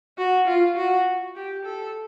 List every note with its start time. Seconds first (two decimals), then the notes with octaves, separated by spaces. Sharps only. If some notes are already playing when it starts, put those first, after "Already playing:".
0.18 F#4
0.48 F4
0.77 F#4
1.36 G4
1.65 A4